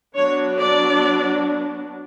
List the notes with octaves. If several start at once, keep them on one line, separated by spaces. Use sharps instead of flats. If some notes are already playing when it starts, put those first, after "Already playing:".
F#3 B3 D4 C#5
D5